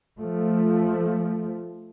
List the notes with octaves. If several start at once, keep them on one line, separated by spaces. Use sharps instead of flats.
F3 A3